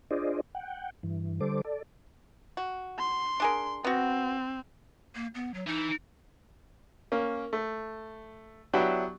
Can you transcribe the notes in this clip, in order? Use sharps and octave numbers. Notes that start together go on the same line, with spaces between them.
D4 F4 G#4 C5 D5 D#5
F#5 G5
G2 E3
D3 G3 A4 C5 D6
A4 D5
F#4
C6
D4 G#4 A#4
B3 C4 F#4
A#3
B3
F#3
E3 D#4
A#3 C#4
A3
F#3 B3 D4 E4 F#4 G4